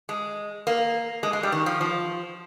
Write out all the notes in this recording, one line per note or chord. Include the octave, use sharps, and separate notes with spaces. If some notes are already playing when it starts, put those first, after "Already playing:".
G#3
A#3
G#3
G#3
G3
D#3
F3
F3